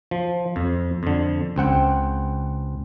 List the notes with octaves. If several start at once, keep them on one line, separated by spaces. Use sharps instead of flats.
F3
F2
F2 D3
C#2 C4 F#5 G5